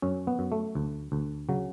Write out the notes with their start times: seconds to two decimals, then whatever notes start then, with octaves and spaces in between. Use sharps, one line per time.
0.02 F#2 C#4
0.27 B3
0.39 F#2
0.52 A3
0.75 D2
1.12 D2
1.49 C#3 F#3